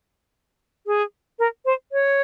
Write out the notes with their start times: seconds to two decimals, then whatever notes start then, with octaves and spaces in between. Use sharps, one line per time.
0.87 G#4
1.39 A#4
1.65 C5
1.92 C#5